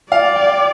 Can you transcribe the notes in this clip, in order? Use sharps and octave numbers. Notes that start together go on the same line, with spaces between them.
D5 F5
G5